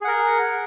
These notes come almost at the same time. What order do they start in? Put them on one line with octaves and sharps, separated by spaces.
G#4 F#5 A#4